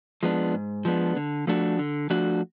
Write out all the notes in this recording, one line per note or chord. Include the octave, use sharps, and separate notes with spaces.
F3 G#3 B3 D4
G#2
F3 G#3 B3 D4
D3
F3 A3 D4 F#4
D3
F3 A3 D4 F#4